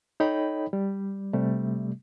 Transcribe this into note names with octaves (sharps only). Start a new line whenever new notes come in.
D#4 A4 C#5 D#5 G5 B5
G3
C3 G3 A3